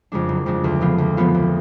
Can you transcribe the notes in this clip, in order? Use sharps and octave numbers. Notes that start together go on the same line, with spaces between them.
F2 C#3 G#3 D4
F#1
F2 C#3 G#3 D4
D2
C#3 F3 B3 F4
D2
C#3 F3 B3 F4
D2